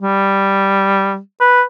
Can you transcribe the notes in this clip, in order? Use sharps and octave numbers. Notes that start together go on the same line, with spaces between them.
G3
B4